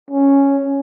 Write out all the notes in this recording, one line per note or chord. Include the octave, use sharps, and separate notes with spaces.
C#4